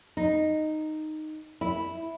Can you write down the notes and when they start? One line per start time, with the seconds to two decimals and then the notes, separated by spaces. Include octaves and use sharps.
0.17 D#4
1.61 E4